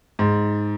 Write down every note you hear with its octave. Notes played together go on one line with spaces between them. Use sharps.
G#2